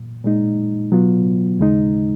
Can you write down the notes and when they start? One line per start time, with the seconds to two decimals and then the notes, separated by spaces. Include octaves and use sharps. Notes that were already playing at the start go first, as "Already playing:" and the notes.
Already playing: A#2
0.24 A#2 G#3 D#4
0.92 B2 F#3 B3 F4
1.59 D#2 C#3 G#3 D#4